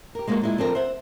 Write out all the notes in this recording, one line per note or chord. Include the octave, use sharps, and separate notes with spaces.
G4 A#4
G#3 A#3 B3 D4 F4 F#4
A#2 G#3 E4
F3 C4 D4 A4 A#4
C5 E5 F#5